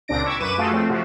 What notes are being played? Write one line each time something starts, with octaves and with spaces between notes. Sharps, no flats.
C#2 A#2 C4 D4 A#6 D7
B5 C#6 D6 E6 G#6
F#2 B4 D6 D#7 E7
A3 F4 F#4 G#4 A4
F3 A3 C4
C3 F3 F#4